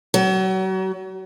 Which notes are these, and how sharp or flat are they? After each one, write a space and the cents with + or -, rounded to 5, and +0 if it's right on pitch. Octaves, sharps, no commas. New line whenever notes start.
F#3 +35